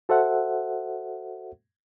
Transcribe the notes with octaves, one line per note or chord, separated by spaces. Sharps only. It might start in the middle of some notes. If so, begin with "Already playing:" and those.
F#4 A4 C5 E5 F#5